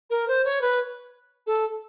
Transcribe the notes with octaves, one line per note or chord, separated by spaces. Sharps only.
A#4
C5
C#5
B4
A4